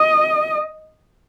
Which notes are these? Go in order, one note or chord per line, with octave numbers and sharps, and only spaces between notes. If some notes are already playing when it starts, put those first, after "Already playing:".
Already playing: D#5